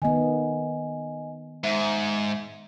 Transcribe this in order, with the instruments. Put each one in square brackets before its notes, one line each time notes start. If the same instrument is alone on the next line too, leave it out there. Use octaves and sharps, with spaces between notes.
[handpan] D#3 B3 [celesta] D#5 G#5
[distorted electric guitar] G#2 [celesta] E5